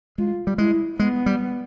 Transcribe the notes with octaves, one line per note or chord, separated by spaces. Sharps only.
G#3 F4
G3
G#3 E4
G#3 B3
G3